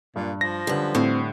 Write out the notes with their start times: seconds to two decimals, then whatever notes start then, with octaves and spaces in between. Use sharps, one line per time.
0.16 G2 A#2
0.41 F3 A#6
0.67 F#2 D3 G3 B4
0.95 A2 C4